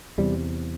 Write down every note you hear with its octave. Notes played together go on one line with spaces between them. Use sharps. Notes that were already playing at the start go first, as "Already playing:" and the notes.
E2 C3 G3